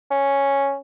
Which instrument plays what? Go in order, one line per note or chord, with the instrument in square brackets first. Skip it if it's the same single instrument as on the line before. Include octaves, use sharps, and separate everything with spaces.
[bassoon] C#4